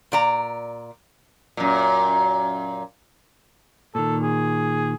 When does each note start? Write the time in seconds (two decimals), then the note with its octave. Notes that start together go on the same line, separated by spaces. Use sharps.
0.12 A#2 D5 A#5
1.57 F#2 A#2
3.95 A#2 D#3 A4
4.23 G#4